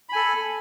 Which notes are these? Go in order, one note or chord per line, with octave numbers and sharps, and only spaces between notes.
A4 G#5 B5